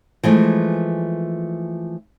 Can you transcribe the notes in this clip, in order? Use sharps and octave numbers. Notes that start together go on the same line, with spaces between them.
E3 F3 G#3 A3